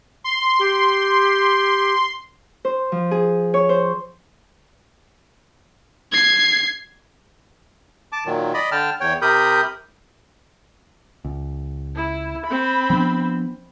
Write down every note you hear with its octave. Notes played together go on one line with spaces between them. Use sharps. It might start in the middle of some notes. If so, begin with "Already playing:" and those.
C6
G4
C5
F3
G#4
C#5
C5
G#6 C7
A5 D6
A#2 D#3 F#3
D5 D#5 B5
D3 G5 A5 F6
E2 C#5 G5
C3 G4 A#4 B5 D#6 G6
C#2
E4
C4 B5
F3 B3 D4